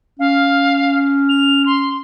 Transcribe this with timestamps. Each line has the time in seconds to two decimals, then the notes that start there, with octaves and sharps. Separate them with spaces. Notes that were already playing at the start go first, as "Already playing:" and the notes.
0.19 C#4 F5
1.29 F7
1.66 C6